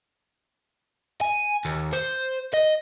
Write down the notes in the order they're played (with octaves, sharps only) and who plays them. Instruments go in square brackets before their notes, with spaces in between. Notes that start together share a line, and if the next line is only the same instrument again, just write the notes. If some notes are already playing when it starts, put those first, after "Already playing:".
[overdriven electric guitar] G#5
D#2
C5
D#5